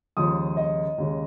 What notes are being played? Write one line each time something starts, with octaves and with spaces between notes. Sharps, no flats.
D#2 C#3 F3 G#3 D#6
D#5
D#2 C#3 G#3